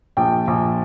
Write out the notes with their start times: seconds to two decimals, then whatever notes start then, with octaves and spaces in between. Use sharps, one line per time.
0.17 A#1 G5
0.47 A#1